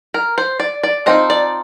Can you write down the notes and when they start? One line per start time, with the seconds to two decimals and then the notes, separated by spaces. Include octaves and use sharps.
0.14 A#4
0.38 C5
0.60 D5
0.83 D5
1.06 F3 C4 D#4 D#5
1.30 D5